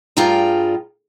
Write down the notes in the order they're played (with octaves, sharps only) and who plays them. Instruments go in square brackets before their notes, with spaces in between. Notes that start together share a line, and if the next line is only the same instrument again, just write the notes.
[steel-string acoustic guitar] G2 G3 F4 G#4 G5 A#5